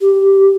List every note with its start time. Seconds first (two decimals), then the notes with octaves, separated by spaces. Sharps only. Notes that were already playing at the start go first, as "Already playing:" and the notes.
0.01 G4